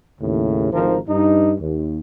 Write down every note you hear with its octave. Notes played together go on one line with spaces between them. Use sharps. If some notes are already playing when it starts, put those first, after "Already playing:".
D#2 A2 C#3
G#1 D2 D#3 F3 A#4 C5
G2 D#4
D#2